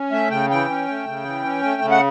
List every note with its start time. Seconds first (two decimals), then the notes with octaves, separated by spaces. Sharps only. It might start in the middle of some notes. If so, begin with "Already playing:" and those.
Already playing: C#4
0.11 A3 E5
0.30 C#3 G5
0.50 E3 G5
0.69 C#4
0.88 A3
1.07 C#3
1.25 E3
1.44 C#4
1.63 A3
1.82 C#3
1.91 F#5